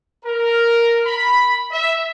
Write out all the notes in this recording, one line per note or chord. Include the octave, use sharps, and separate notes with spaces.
A#4
B5
E5